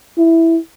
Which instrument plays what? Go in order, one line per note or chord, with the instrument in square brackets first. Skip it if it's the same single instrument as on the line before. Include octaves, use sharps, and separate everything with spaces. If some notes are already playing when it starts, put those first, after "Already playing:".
[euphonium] E4